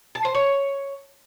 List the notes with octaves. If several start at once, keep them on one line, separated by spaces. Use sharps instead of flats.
A5
C5
C#5